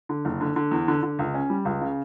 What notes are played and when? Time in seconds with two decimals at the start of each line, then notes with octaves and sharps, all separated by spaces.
0.09 D3
0.25 F#1
0.41 D3
0.56 D3
0.71 E2
0.88 D3
1.03 D3
1.19 C#2
1.34 C#4
1.50 G3
1.65 C#2
1.81 C#3